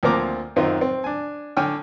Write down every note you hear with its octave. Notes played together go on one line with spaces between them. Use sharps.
D2 F3 A#3 C4 A#5 D6
F#2 D#3 C4 D#4 F4
C4
D4 G#5
D3 C#5 G5 G#5 F6